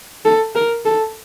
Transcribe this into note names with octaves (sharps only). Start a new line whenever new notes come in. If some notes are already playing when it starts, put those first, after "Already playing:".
A4
A#4
A4